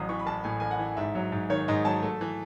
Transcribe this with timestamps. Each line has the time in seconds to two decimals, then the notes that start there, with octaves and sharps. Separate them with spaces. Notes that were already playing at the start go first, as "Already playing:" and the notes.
Already playing: A1 F#3 D#6
0.09 E3 C#6
0.19 B5
0.26 A1 A5
0.44 A2 G#5
0.60 A1 G#5
0.71 F#5
0.79 E3
0.97 G#2 E5
1.15 F#3
1.32 G#2
1.50 D#3 C#5
1.68 G#2 D#5
1.85 F#3 A5
2.03 A3
2.21 E3